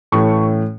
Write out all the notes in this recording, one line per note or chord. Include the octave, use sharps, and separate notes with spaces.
A2 E3 A3 C#4 C#6